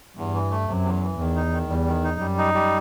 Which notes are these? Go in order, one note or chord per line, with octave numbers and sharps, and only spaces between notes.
E2 G2
E3
A3
F#2 C3
E2
E3
E2 D#3
D#4
D#3
E2 G3
D#3
D#4
F#2 G3
D#4
G3